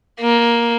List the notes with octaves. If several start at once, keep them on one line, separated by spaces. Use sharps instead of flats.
A#3